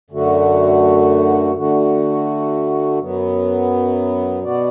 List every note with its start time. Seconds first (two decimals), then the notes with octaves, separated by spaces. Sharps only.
0.10 F#2 D3 A3 F#4
1.55 D3 A3 F#4
2.99 F#2 F#3 B3
4.43 B2 B3 F#4 D5